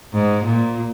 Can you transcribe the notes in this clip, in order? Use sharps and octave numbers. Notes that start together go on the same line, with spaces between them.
G#2
A#2